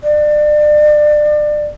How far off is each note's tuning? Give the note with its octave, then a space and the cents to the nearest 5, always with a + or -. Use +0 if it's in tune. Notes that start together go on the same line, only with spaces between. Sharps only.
D5 +30